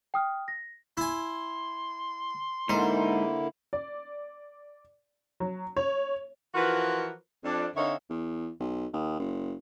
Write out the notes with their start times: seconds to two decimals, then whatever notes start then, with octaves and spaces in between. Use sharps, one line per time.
0.14 G5 D#6 F6
0.48 A#6
0.97 E4 G#5 C6
2.69 G#2 D3 A#3 D#4 E4 C5
3.73 D5
5.40 F#3
5.77 C#5
6.55 E3 F3 F4 F#4 A#4 B4
7.44 F2 D4
7.75 D3 C4 D#4 C#5 E5 F5
8.10 E2
8.60 B1
8.93 D#2
9.19 F#1